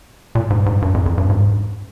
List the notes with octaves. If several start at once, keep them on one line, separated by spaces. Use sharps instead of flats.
A#2
G#2
G#2
G2
F2
F2
G2
G#2